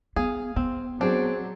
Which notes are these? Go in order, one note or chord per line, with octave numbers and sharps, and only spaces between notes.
B3 G#4 F5
B3 C4
F#3 C4 D4 G#4